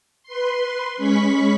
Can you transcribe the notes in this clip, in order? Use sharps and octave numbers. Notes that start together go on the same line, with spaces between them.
B4 C6
G#3 C#4 B5 C#6 B6